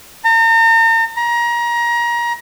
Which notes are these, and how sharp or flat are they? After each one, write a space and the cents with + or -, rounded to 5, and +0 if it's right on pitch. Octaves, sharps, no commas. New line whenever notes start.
A#5 -40
A#5 +30